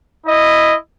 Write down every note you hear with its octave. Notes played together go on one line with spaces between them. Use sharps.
E4 D#5